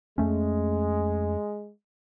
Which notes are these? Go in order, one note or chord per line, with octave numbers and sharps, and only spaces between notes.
F2 G#3 A3 C#4